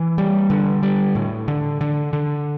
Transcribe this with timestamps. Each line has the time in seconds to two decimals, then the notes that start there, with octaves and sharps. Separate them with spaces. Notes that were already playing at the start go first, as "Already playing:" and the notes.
Already playing: E3
0.18 G3
0.50 D3
0.83 G3
1.15 A2
1.48 D3
1.81 D3
2.13 D3